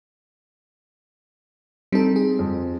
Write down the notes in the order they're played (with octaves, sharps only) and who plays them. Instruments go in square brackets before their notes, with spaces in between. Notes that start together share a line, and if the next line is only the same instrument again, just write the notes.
[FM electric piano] G3 A4 [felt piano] C4 D#4
[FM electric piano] G#4
[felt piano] F2